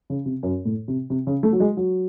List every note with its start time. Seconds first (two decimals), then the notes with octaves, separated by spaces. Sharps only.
0.10 C#3
0.26 C3
0.43 F#2
0.65 A2
0.88 C3
1.10 C3
1.27 C#3
1.43 A3
1.53 F#3
1.60 G#3
1.77 F#3